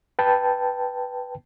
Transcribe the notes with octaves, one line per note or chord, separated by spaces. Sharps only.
B4 G5 A5